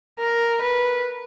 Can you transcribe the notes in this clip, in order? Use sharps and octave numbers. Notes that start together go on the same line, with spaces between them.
A#4
B4